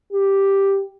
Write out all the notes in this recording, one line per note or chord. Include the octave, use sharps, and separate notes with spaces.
G4